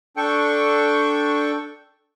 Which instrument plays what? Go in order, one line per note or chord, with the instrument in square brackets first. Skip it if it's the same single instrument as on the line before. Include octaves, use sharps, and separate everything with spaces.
[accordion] D4 A4 G5 C#6